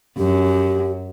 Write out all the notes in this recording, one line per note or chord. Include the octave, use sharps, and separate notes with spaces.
F#2 G4